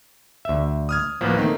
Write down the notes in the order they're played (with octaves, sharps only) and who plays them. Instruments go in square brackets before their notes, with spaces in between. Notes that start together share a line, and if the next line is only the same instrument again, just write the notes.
[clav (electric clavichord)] D2 E5
[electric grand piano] D#6 F6 G#6
[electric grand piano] A1 D2 [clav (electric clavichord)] F3 A#3 B3
[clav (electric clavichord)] D#3 [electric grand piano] A3 A#3 C4